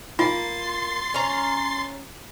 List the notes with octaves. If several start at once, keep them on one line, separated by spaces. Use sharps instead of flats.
A#3 F4 G#5 C6 A6 C7
C#4 A#5